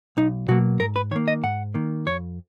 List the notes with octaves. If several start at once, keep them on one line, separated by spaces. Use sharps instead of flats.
B1 D#4
B2 F#3 A#3 F#4
G#2 A#4
B4
D#3 A#3 C#5
D#5
G#2 F#5
D#3 A#3
F2 C#5